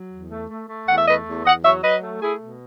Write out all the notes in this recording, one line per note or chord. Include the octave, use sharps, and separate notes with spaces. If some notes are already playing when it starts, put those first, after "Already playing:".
Already playing: F#3
E2
A3
A3
A3
E2 F#5
E5
A3 B4 D#5
E2
E2 D#5 F#5
F#3 C#5 E5
F#3 B4 D#5
A3
A3 E4 G#4
B2